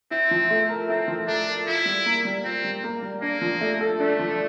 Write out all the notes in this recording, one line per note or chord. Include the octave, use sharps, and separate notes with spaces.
C4 E4
F3
A3
A#4
C4 E4
F3
A3 D4
A#4
E4 F4
G3
A#3
G3
C4 F4
G3
A#3
G3
A#3 D4
F3
A3
A4
A3 D4
F3